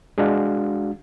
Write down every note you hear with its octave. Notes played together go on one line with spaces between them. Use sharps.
G#3 D4 F#4 F5